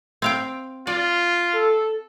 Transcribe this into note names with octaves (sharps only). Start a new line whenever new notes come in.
C4 F5 G5
F4 D5
A4